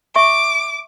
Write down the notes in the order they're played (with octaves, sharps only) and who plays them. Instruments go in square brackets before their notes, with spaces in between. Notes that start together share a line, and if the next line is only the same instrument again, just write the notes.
[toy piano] E5 C#6 [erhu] D6